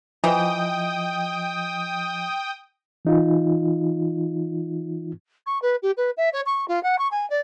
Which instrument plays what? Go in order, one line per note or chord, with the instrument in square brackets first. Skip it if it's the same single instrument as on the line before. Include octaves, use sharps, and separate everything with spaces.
[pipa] E3 [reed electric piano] F3 D#5 [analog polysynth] G5 D#6
[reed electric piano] E3 D#4 F4
[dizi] C#6
B4
G4
B4
E5
C#5
C#6
F4
F#5
C#6
G#5
D5